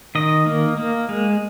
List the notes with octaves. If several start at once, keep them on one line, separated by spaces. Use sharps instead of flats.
D#3 D#5
A#3
A#3
G#3